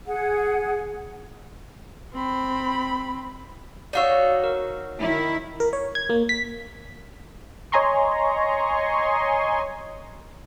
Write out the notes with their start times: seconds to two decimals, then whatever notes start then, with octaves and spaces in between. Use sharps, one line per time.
0.06 G#4 F#5
2.15 C4 B5
3.93 D#4 F#4 C#5 D5 F5 E6
4.44 A#4
4.99 D#3 E4
5.60 A#4
5.73 C#5
5.95 G#6
6.10 A#3
6.29 B6
7.72 C#5 D#5 G#5 A#5 C6 C#6